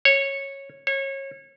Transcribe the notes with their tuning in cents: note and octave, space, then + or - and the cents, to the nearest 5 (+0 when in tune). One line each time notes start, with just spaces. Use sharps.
C#5 -10
C#5 -25